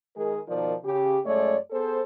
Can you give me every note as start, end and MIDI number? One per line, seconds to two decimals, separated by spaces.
0.16 0.39 51
0.16 0.39 56
0.16 0.39 68
0.16 0.39 70
0.47 0.74 47
0.47 0.74 51
0.47 0.74 53
0.47 0.74 70
0.47 0.74 74
0.84 1.18 49
0.84 1.18 67
1.24 1.57 42
1.24 1.57 56
1.24 1.57 57
1.24 1.57 73
1.24 1.57 74
1.71 2.01 59
1.71 2.01 68
1.71 2.01 69
1.71 2.01 72